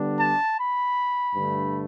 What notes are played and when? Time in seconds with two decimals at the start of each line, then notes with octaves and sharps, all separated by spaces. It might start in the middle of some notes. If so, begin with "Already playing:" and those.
Already playing: D3 G3 B3 D4
0.19 A5
0.58 B5
1.35 G2 D3 A3